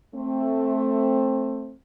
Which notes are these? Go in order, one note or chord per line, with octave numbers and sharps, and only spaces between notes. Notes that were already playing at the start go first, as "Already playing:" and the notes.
A3 C4